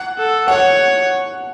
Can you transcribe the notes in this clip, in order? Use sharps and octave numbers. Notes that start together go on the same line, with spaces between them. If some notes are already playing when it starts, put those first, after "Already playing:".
Already playing: F#5
A4
C#5 F#5